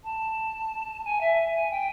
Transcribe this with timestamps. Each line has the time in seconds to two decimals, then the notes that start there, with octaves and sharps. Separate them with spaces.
0.04 A5
1.04 G#5
1.20 E5
1.54 G#5
1.70 G5